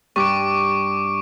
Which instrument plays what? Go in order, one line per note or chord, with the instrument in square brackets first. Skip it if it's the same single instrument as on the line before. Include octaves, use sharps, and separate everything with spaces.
[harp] G2 [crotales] C#6 D6 D7